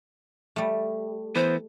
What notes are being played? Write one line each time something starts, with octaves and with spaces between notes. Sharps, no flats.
G3 A3
E3 B3 C5